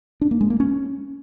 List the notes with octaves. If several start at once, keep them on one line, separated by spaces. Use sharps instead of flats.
D4
A#3
G#3
A#3
C#4